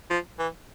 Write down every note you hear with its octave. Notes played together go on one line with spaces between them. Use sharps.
F3
E3